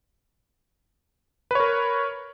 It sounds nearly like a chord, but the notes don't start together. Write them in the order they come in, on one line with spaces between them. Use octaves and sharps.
B4 C#5 A#4